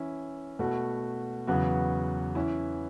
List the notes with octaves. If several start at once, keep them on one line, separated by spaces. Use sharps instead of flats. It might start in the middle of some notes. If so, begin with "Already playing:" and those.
Already playing: E3 C#4 E4
B2 A3 F#4
E2 C#3 F#3 B3 F#4
E3 C#4 E4